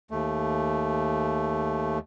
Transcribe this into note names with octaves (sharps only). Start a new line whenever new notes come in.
D#2 A3